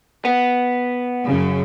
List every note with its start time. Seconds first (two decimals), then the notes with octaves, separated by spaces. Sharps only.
0.25 B3
1.26 F#2 C#3